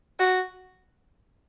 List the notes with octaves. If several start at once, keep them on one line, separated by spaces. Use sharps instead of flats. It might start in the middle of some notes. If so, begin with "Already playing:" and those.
F#4